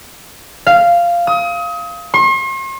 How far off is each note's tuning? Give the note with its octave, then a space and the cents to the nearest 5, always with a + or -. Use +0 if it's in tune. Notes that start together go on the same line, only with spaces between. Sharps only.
F5 -10
D#6 +35
C6 +45